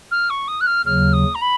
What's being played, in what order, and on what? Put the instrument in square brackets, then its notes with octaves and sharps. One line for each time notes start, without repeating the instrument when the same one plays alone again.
[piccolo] F6
C#6
D#6
F#6
F6
[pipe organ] D#2 C#3 F#3 [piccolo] F6
[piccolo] D#6
A#5
B5